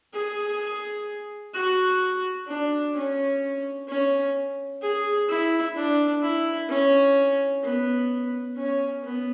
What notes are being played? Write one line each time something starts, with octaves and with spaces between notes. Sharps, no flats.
G#4
F#4
D4
C#4
C#4
G#4
E4
D4
E4
C#4
B3
C#4
B3